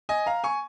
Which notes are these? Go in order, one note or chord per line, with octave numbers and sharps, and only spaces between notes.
D#5 G#5
F5 A#5
G#5 C#6